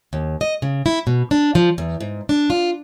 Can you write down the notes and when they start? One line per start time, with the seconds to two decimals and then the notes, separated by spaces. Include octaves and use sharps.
0.13 D#2
0.41 D#5
0.62 C#3
0.86 E4
1.07 B2
1.31 D4
1.55 F3
1.78 E2
2.01 G#2
2.29 D4
2.50 F4